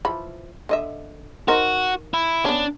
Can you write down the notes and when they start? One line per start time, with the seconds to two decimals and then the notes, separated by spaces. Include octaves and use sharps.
0.05 E3 F3 B5
0.69 D3 D#5 E5
1.48 D#4 F#4 A#4 C5
2.14 E4
2.45 B3 C#4 D4